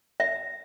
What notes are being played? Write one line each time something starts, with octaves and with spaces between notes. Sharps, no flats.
E5